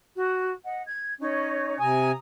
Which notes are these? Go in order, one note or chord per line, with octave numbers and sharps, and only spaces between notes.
F#4
D#5 F#5
G#6
C#4 D#4 C#5
C3 G#5 A#5 D#6